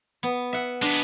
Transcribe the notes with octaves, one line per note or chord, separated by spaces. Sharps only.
B3
E5 F#5
G#3 B3 D4